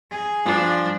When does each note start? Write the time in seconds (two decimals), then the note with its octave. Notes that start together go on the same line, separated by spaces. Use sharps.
0.11 G#4
0.45 G2 F3 D4 F4